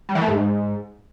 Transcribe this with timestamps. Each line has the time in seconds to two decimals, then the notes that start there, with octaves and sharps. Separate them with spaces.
0.09 G3
0.15 E3
0.21 A3
0.28 G#2